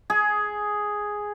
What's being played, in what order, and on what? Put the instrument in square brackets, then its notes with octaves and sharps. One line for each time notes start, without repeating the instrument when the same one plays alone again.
[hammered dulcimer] G#4